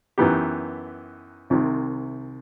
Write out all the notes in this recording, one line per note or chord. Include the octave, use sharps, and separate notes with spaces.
F#2 E3 B3 D#4 G4
C2 C3 D#3